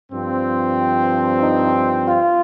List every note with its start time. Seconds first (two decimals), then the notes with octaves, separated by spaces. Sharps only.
0.12 G2 F3 C4
1.42 D#4
2.06 F4